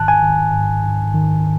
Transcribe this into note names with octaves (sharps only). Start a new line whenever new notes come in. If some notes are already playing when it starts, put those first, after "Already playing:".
Already playing: G#2 D#3 A5 F#6
G#5
D#3
G#2
G#2
D#3